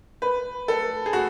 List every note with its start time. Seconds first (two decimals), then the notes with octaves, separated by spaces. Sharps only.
0.22 B4
0.68 A4
1.06 G#4
1.13 F#4